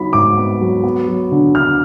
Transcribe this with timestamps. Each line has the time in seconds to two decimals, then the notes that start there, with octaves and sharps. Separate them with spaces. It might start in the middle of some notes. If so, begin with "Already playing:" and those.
Already playing: F#3 B3 D#4 B5
0.13 G#2 D6
0.38 B3
0.60 F#3
0.84 B3
1.08 F#3
1.32 D3
1.55 D3 F6